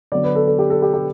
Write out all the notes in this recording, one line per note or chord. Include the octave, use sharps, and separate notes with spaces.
D3 F#3 B3 D5
B4
A4
A4
G4
A4
G4
G4